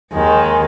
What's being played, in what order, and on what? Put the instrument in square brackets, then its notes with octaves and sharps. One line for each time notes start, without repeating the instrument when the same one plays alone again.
[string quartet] D#2 D#3 G#3